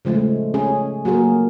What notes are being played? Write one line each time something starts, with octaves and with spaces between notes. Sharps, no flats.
C#3 F3 G#3 A3
C#4 G#4
F#3 A#3 F#4 G#4 A#4